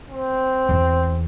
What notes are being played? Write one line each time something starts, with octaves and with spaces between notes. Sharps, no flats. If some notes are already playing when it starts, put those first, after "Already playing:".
C4
E2